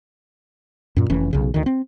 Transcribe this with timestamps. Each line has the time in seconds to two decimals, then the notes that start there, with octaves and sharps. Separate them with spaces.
0.96 F#2 A#2
1.10 F1 E3 C#4
1.33 B1 C#3
1.54 D2 D#3
1.66 C4